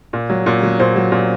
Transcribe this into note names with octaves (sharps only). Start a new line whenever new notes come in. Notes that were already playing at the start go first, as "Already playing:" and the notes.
A#2
F#3
A#2
F#3
A#2 C5
F#3
A#2